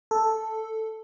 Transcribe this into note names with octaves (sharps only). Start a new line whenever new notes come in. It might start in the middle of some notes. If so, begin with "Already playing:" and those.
A4